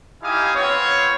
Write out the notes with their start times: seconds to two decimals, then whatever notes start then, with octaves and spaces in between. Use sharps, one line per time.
0.22 D#4 E4 G4 F5 G#5 D#6
0.54 B3 C4 F4 C#5